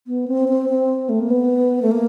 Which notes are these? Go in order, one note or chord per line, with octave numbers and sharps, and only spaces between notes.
B3
C4
C4
C4
A3
A#3
B3
A3
A#3